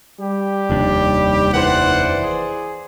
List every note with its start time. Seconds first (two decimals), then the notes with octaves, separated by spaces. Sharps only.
0.20 G3 G4
0.70 F1 D#2 D4
1.53 E3 C5 D5 F#5
2.23 G#4